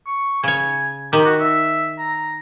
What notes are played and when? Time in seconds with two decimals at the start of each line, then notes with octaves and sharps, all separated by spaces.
0.07 C#6
0.44 C#3 C#5 G#5
1.13 D#3 G4
1.25 F#4
1.41 E5
1.99 A#5